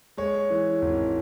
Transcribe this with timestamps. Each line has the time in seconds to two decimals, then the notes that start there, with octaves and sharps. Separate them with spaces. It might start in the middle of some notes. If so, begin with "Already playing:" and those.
0.17 G#3 C#5
0.50 E3
0.82 G#1